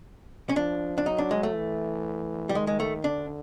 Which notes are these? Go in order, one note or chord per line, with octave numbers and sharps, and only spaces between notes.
C#4
F3 D4
D4
F#3 D#4
D4
G#3
A3
E3
G3
D#3 G#3
G#3
A3
D3 D4